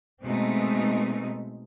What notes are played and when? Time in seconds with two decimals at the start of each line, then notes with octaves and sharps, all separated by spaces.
0.23 B2 G#3 A3 C4 D#4